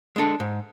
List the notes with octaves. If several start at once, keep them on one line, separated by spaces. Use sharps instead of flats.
G#3 D4 A4
G#2